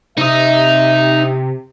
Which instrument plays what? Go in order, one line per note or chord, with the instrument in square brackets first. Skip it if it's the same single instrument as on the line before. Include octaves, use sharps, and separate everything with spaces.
[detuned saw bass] C3 [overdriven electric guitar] D#4 D#5 [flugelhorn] E5